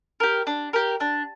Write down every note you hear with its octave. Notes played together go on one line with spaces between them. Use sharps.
G4 A#4
D4
G4 A#4
D4